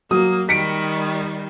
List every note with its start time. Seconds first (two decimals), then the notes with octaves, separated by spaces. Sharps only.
0.11 F#3 A#3 D#6
0.49 D#3 G3 B6 C#7 D7